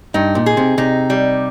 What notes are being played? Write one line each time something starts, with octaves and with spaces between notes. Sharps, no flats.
G2 D#4
A#2
G#4
C3
C3 D#4
G3